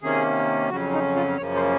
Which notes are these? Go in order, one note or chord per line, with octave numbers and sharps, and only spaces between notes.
C3 D#3 A#3 C#4 G#4
F2 C#3 F#3 C#4 F#4
D#4
F4
F#2 C#3 F3 A#3 C#4 C#5
C5